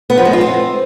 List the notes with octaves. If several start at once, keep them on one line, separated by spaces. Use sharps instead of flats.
B3
F3
G#3
F4
C4